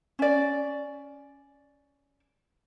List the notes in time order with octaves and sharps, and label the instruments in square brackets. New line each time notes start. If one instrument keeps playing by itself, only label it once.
[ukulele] C#4 D5